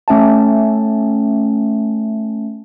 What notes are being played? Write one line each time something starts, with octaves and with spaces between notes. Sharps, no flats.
A3 C#4 E5 G5 A5